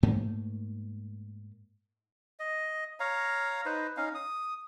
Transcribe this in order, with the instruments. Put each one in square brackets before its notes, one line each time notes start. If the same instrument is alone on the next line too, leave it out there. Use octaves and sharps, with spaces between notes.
[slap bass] G#2 A3 A#3
[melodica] D#5
C#5 F5 A#5
D#4 B4 C5
C#4 D#4 F5
D#6